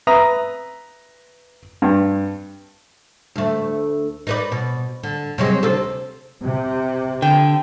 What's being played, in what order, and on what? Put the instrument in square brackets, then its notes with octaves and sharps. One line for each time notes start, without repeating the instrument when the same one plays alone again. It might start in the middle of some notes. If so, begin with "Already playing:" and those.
[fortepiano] B4 E5 A#5 D#6
G2
[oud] D2 A3
D#4 B4 D5
B2
D3
C3 F#3 G#3
D2 C3 A4
[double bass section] C3
[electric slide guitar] D3 [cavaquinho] G5